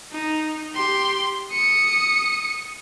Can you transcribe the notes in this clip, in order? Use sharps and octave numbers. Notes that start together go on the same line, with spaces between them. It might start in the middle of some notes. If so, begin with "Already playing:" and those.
D#4
G4 C6
D#6 C#7